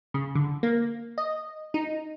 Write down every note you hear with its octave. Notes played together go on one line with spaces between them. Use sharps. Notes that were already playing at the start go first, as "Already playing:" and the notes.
C#3
D3
A#3
D#5
D#4